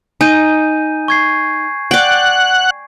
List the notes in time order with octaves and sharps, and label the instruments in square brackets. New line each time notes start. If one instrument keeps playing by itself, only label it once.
[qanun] D#4 [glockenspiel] G#5 G6 D#7
[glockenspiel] C#6 G#6 C7
[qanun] D5 G5 [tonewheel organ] F#5 F#6